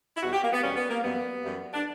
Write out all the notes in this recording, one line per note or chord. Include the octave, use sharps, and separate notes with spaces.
E4
E2 B2 G3 F#4
G4
A#3
B3
E2 B2 G3 C#4
B3
A#3
F#2 E3 G3 B3
F#2 E3 G3
D4